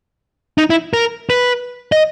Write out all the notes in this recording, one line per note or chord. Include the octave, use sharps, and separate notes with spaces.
D#4
E4
A#4
B4
D#5